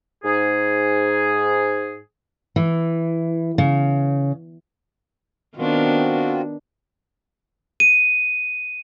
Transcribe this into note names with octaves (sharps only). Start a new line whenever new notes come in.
G#2 G#4
E3
C#3
D#3 B3 C4 D4 F4 F#4
D#7